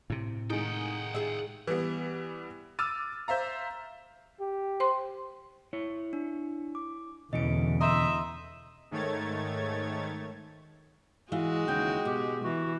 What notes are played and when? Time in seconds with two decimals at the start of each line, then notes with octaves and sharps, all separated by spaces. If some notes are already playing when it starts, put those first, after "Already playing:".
0.10 A2 C3
0.50 D#3 G#3 A3 D#4 F#5 G5
1.14 F4 G#4 E5
1.67 E3 G3 B3
2.79 D6 E6 F6 A6 D#7
3.28 C5 E5 F5 A#5
4.40 G4
4.80 C5 C6
5.73 E4 C#5
6.13 D4
6.75 D6
7.33 E2 B2 D3 E3 C#4 D#5 C#7 D7
7.81 D#5 E5 A#5 C6 G6
8.91 G#2 D#3 A3 C#5 G#6 A6
11.32 E3 G#3 F#4 F5
11.68 D#2 C#3 E3 G5
12.05 B2 G4
12.44 E3 F#4